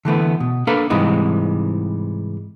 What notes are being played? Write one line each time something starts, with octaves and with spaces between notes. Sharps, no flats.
D3 E3 A3 B3
B2
A#3 D4 A4 B4 F5 A#5
G#2 C3 E3 G3 G#3 D#4